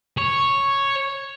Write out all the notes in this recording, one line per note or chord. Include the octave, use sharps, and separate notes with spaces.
C#5